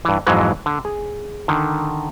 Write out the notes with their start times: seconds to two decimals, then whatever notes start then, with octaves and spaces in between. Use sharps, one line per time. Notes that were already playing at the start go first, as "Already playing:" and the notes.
0.05 G2 E3
0.27 F2 G#2 E3 F#3 G#3
0.66 D3
0.85 G#4
1.48 D3 D#3